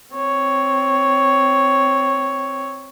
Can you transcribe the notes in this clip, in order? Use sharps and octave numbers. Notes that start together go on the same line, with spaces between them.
C4 C#5